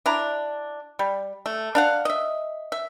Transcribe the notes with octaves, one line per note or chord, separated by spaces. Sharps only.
D4 E4 A#5
G3
A3
D4 F5 F#5
D#5 E5
E5